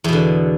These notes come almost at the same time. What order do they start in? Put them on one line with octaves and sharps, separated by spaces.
E2 B2 D3